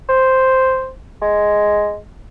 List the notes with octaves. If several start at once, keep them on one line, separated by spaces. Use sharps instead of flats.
C5
G#3